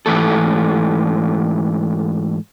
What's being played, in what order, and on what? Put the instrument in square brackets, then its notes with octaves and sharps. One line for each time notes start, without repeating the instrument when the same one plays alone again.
[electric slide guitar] G#2 E3 A3 A4